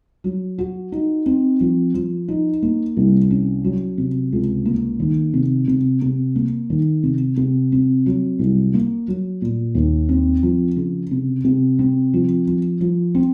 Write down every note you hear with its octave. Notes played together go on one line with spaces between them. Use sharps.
F#3
F#4
D#4
C4
F3
F3
D#4
A#3
C2
C#4
F#3
C3
C#2
A#3
D#3
C3
C3
C3
A#3
D#3
C3
C3
C4
F#3
C2
A#3
F#3
A#2
D#2
C4
F3
C#3
C3
C3
C4
F3
F3
F3
C4